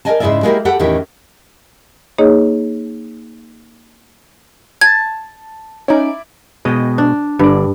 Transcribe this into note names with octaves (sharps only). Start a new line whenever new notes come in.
A#4 B4 D5 D#5 G#5 A5
G#2 C#3 E4 G#4 D5 E5
G#3 A#3 D#4 E4 G4 A#4
G4 A4 B4 F#5
E2 A2 D#3 C#4 E4 G4
A#3 D#4 G#4 C#5 D#5
A5 G#6
C#4 D#4 E4 D5
B2 G#3 D#5 G5
D4
G1 G2 D5